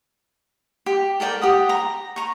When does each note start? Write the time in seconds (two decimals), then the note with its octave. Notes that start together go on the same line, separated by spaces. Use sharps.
0.86 G4
1.20 A4 A#4 D5 G5
1.41 G4 F#5 D#6
1.69 A#5
2.16 A#5 C#6